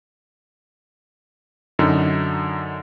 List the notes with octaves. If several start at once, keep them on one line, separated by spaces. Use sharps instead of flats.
F#2 D3 D#4